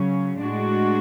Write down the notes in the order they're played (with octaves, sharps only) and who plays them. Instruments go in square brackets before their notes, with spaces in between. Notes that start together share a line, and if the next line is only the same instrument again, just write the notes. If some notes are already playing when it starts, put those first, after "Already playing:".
Already playing: [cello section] C#3 F#3 C#4
A2 G#3 D4 F#4